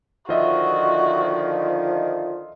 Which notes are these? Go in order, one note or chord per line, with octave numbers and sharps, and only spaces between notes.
D3 D#3 F3 F4 F#4 D#5 E5